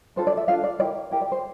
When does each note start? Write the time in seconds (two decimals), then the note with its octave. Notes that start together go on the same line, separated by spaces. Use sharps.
0.16 D4 F4 A4 C5
0.27 D5
0.37 E5
0.48 D4 F4 A4 F5
0.64 D5
0.79 E4 G4 A#4 D5
1.11 E4 G4 A#4
1.21 D5
1.32 C5